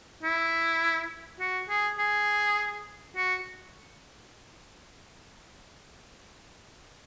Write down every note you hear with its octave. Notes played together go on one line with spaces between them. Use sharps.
E4
F#4
G#4
G#4
F#4